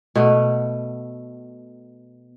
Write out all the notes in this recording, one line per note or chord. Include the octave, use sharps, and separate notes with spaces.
B2 A3 B3